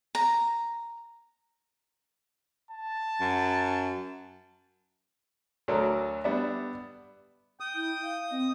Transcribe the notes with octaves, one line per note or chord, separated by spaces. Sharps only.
A#5
A5
F#2
D2 F#3 A4 A#4 D5
G3 B3 D4 E5
G5 D#6
E4
F5
C4 D#5